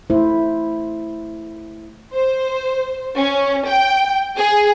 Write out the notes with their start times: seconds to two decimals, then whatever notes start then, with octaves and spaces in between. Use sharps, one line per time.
0.10 A3 E4 C5
2.13 C5
3.16 C#4
3.67 G5
4.36 G#4